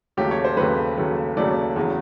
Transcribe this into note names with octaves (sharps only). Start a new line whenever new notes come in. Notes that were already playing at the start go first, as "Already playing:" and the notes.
D#2 C#3 F#3 A3 G4
C#5
C5
D#2 C#3 F#3 A3 B4
D#2 C#3 F#3 A3
D#2 C#3 F#3 A3 D5
E2 C#3 F#3